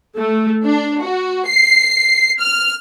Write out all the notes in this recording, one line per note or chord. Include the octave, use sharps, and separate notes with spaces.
A3
D4
F#4
C7
F6